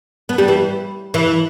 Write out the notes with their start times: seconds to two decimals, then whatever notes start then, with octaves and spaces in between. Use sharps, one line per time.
0.29 B3
0.38 G3
0.48 E3
1.14 E3